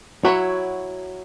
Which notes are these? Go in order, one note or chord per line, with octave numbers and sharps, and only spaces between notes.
F#3 E4 F#4 C#5